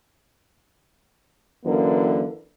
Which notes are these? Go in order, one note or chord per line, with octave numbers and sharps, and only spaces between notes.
F#2 D3 E3 A#3 B4